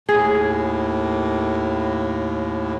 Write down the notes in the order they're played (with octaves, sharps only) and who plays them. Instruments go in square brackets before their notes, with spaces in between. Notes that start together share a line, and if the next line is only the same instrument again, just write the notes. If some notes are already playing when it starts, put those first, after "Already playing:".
[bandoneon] D#2 A2 [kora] G#4